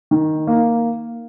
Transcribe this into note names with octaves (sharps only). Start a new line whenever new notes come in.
D#3
A#3